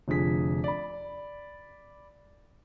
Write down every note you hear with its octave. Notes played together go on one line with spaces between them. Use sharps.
F1 D3 F3 G#4 B6
D5 B5